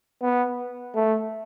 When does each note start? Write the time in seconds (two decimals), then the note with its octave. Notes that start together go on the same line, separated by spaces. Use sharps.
0.22 B3
0.95 A3